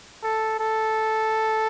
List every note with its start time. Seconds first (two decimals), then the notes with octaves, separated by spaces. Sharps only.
0.23 A4
0.60 A4